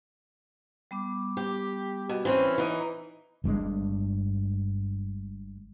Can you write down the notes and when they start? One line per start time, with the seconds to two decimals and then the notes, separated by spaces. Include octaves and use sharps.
0.91 G3 B3 D6
1.37 G4
2.09 B2
2.25 E3 C4 C#4
2.58 E3 D#4
3.44 G1 G2 C3 G#3